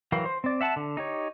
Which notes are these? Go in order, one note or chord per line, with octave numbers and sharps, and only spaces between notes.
E3 F#3 A#4 F5 G5
C5
C4 D5
E5 F#5 A5
D3
D#4 G4 C#5